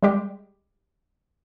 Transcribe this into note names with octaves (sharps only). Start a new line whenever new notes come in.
G3 G#3 G4